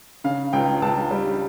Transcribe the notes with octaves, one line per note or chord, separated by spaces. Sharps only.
C#3 F5
C#2 G5
C#2 A5
G3